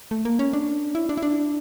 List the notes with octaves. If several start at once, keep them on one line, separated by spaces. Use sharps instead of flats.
A3
A#3
C#4
D4
E4
D4
E4
D4